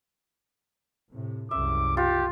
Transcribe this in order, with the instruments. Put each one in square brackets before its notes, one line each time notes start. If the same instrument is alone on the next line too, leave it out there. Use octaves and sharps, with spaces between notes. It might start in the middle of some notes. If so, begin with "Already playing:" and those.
[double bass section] A2 C3
[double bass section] C2 F#2 C#3 [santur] E5 [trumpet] D6
[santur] F4 [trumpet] G4